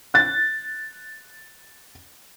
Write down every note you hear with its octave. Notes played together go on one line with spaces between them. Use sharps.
F#6 A6